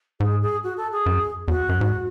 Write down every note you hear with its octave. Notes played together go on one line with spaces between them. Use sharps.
G#2 G#4
G#4
F#4
A4
G#4
F#2
E2 F#4
F#2
G#2